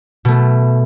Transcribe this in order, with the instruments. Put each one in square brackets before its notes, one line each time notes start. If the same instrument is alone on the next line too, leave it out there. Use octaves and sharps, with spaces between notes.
[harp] B2 A3